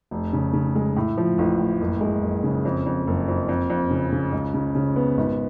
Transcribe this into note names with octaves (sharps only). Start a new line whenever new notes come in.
F1
C#3
C#3
G#3
A2
F3
A1
A2
F#1
G#3
F#1
C#3
F2
F2
F#1
F2
F2
F2
C#3
C#3
C#2
C#3
C#3
B3
G#1